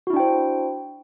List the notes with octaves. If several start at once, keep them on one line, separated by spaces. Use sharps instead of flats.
D4 E4 F#4 C5 G5